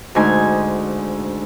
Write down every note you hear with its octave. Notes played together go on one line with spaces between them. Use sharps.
D2 G#2 D#4 G#5 C6